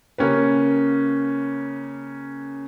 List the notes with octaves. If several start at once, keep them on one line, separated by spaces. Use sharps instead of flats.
C#3 A#3 C#4 G4 B4